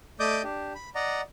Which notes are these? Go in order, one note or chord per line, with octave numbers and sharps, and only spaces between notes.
A3 D5 D#5 D6 D#6 G6
D4 G4
B5
D5 D#5 F#5 A#5